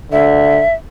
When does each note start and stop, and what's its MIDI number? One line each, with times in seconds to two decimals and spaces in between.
0.12 0.62 50
0.12 0.74 76